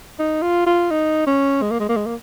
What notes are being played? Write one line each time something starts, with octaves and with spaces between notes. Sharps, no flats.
D#4
F4
F4
D#4
C#4
G#3
A#3
G#3
A#3
G#3
A#3